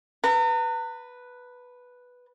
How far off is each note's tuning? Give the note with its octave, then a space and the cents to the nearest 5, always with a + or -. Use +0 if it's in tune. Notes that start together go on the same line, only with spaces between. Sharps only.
B4 +0 A#5 -40